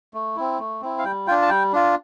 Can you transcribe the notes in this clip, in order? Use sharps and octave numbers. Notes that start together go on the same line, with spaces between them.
A3
C4 E4
A3
C4 E4
F5
G3 G5
D4 F4 G5
A5
G3 G5
D4 F4